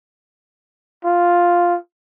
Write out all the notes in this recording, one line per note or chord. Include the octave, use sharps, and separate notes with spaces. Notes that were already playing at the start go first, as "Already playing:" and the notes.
F4